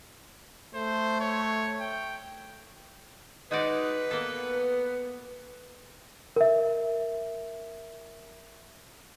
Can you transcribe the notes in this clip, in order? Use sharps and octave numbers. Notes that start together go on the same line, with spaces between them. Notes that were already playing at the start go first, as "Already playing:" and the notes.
A3 C5
C#5
G5
G#3 D#4 F#4 B4 D5
A#3 B3 A4
A#4 E5